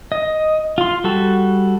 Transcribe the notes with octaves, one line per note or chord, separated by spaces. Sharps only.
D#5
F4 C6
G3 F#4 A4